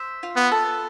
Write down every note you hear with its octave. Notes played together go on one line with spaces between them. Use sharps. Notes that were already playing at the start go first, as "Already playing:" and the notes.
Already playing: C5 E5
F4
B3
A4